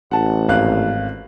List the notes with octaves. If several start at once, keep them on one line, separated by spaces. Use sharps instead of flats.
A1 F#5 A5
G#1 F5 F#6